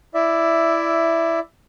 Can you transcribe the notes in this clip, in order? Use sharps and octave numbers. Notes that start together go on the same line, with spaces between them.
E4 D5 E5